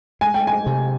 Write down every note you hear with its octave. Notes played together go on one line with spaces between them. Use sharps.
G#3 G#5
G5
G#5
C3